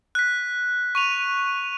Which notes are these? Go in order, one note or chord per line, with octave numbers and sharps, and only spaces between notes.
F#6 B6
C#6 D#7 F7